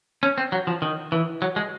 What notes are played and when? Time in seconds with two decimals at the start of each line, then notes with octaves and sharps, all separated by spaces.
0.23 C#4
0.38 C4
0.52 F#3
0.67 F3
0.82 D#3
1.12 E3
1.42 F#3
1.56 G#3